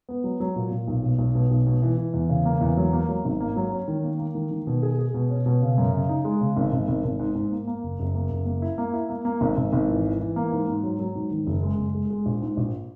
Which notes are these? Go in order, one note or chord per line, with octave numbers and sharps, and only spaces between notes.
B3
F#3
F#3
A#2
A#2
B1
B2
B1
B2
B1
B2
E3
E3
E2
C#3
A#3
E2
F#3
A#3
F#3
G#1
A#3
F#3
C#4
D#3
A#3
A#3
D#3
D#3
B2
G#4
G#4
B2
C#4
B2
C#3
F#2
C#3
D#4
G#3
C#3
G#1
G#1
G#1
G#1
G#2
G#2
A#3
A#3
F#1
F#1
A#3
F#1
A#3
E4
A#3
E4
A#3
A#3
G#1
G#1
G#1
E3
E3
E3
A#3
G#2
G#2
F#3
F#3
G#2
D#3
F#1
G#3
F#1
G#3
G#3
A#1
G#2
A#1